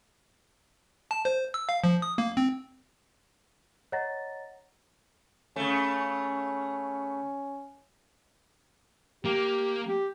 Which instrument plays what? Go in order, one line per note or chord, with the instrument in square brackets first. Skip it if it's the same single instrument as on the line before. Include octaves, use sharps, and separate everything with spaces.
[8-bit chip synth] A5
C5
E6
F5
F3
D#6
A#3
C4
[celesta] C#5 D#5 F#5 A#5 A6 A#6
[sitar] C#3 A3 [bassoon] C#4
[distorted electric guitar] A#3 [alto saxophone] G4
[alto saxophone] G4